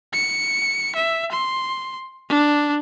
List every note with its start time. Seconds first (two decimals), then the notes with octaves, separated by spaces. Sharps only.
0.13 C#7
0.95 E5
1.32 C6
2.30 D4